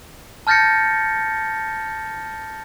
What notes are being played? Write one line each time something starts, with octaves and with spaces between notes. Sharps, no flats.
A5 F6 G6 A6 A#6 C#7